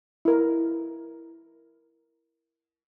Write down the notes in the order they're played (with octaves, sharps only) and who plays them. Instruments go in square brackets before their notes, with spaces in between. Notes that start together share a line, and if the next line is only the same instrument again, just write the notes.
[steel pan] E4 A#4